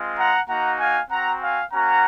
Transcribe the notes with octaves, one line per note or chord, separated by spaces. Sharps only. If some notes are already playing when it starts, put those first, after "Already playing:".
Already playing: G#3 C4 F4
F#5 A#5
A#3 D#4 F#4 F#5 A#5
F5 G#5
C4 F#4 F#5 A#5
F5 G#5
A#3 C#4 F#4 F#5 A#5